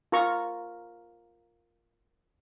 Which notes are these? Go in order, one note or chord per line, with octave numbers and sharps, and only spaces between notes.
F4 A#4 A#5 C#6